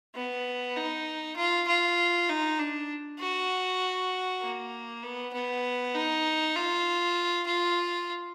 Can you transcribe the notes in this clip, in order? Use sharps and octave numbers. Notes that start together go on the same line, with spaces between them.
B3
D#4
F4
F4
D#4
D4
F#4
A#3
B3
B3
D#4
F4
F4